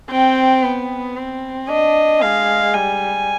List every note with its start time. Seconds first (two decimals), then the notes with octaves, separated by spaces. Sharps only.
0.11 C4 G5
0.63 B3
1.16 C4
1.69 D4 D#5
2.22 G#3 F5
2.74 G3 G#5